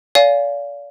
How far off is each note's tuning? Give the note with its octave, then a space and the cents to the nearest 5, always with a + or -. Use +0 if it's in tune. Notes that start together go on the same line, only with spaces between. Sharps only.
D5 -40 F5 +0 G#5 +0